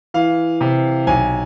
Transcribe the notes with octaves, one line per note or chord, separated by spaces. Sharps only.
E3 F5
C3
B1 G#5